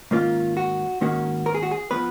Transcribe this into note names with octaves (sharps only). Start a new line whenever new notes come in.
G#2 D#3 A#3 C#4 F4
F#4
G#2 D#3 A#3 C#4 F#4
A#4
G#4
F#4
G#4
F3 G#3 B3 B4